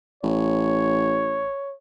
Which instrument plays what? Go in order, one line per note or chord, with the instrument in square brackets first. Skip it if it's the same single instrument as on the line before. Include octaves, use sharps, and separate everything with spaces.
[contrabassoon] A1 [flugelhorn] C#5